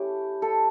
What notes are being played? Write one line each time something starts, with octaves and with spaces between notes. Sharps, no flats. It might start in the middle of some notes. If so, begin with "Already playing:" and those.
Already playing: A3 C#4 E4 G4
A4